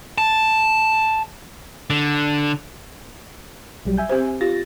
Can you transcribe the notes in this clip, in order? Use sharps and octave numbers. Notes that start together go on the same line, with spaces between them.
A5
D3
B1 F#3 G3
E5 G#5 G6
C4 G4 C5
F4 G4 A6 A#6